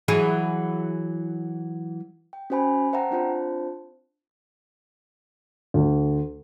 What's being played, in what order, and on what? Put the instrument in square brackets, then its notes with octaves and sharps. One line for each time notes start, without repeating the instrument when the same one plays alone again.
[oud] E3 F#3 G#4
[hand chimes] G5
C#4 F#4 C5 G#5 B5
C5 E5 F#5 G5 A5 A#5
C4 D4 F4 C5 A5
[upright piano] D2